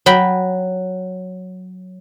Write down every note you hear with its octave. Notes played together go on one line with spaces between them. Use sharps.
F#3 G5 B5